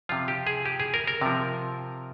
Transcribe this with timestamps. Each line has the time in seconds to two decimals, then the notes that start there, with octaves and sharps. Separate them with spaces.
0.09 C3 F3 F4
0.28 G4
0.47 G#4
0.65 G4
0.80 G#4
0.94 A#4
1.07 A#4
1.21 C3 F3